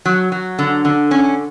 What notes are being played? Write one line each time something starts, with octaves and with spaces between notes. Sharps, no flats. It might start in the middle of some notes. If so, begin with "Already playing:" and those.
F#3
F#3
D3
D3
C#4